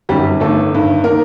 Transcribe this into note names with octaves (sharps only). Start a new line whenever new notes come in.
G1 F#2 D#3 G3 G4
G1 G2 D#3 A3 A4
G1 G2 D#3
D#3 A#3 A#4